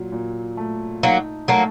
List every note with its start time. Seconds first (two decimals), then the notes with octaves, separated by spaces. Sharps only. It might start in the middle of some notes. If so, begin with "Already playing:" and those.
Already playing: A#2 F#3
0.12 A#2
0.57 A3
1.03 F#3 A#3 D#4
1.48 F#3 A3 A#3